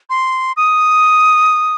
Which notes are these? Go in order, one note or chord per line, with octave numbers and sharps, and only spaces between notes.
C6
D#6